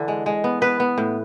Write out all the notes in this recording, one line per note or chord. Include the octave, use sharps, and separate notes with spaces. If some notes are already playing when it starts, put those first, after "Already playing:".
Already playing: D3 E3
G#3
G#3
B3
B3 B4
B3
A2